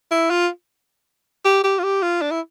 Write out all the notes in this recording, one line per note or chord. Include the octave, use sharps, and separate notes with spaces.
E4
F4
G4
G4
F4
G4
F4
D4
E4